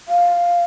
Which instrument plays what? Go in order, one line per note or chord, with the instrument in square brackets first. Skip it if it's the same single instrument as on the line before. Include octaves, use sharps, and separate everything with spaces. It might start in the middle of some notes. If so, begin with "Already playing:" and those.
[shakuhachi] F5